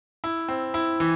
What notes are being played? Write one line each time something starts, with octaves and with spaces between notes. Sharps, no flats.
E4
C4
E4
E3